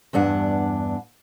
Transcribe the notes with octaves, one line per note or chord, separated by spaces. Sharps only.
E2 G2 D4 F#5